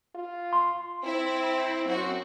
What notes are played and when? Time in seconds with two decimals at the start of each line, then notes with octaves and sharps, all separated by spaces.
0.15 F4
0.53 C6
1.04 C4 E4
1.85 F#2 C4 F#4